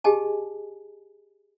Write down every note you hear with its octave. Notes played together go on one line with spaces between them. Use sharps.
G4 G#4 D#5 G#5 A5